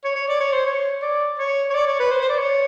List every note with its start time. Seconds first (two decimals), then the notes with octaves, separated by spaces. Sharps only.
0.04 C#5
0.15 C#5
0.28 D5
0.41 C#5
0.52 C5
0.65 C#5
1.02 D5
1.39 C#5
1.70 C#5
1.74 D5
1.87 C#5
2.00 B4
2.11 C5
2.21 C5
2.29 D5
2.39 C#5